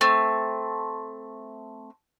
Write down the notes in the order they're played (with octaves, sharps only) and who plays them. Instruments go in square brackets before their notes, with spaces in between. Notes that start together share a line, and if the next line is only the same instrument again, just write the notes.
[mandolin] A3 C4